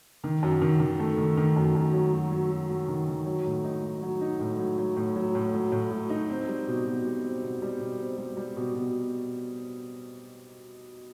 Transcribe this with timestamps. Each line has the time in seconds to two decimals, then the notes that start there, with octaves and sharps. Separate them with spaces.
0.24 D#3
0.43 F#2
0.62 D#3
0.80 D#3
0.99 A3
1.18 D#3
1.37 D#3
1.56 F#2
1.75 F#2
1.93 F#3
2.13 F#3
2.31 F#3
2.51 F#3
2.69 F#3
2.88 D#3
3.08 D#3
3.26 F#3
3.46 A2
3.64 D#4
3.84 F#3
4.02 F#3
4.21 D#4
4.40 A2
4.58 F#3
4.78 F#3
4.96 A2
5.16 F#3
5.35 A2
5.54 F#3
5.72 A2
5.91 F#3
6.10 D#4
6.30 C4
6.48 G3
6.67 B2
6.86 B2
7.05 G3
7.24 C4
7.43 B2
7.62 G3
7.80 B2
8.00 C4
8.18 G3
8.37 G3
8.56 B2
8.75 B2